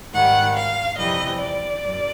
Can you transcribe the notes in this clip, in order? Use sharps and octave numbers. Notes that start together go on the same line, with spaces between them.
G#2 D#3 G3 F#5
F5
F2 C3 E3 G3 D#5
D5
F#2